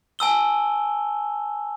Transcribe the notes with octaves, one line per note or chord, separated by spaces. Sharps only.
G#5 A5 E6 G7